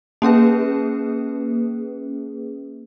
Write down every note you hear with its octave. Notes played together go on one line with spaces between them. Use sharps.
A#3 C#4 G#4 B4